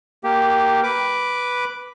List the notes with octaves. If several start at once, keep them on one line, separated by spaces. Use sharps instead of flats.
A#3 G4
B4 D6